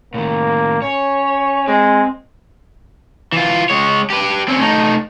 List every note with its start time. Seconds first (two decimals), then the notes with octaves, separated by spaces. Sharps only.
0.14 A2 D#3 A#3
0.82 C#4 C#5
1.68 G#3 C4
3.32 E3 F4
3.70 G#3 C#5
4.10 G4 B4
4.48 C4 C#4
4.61 A3 D#4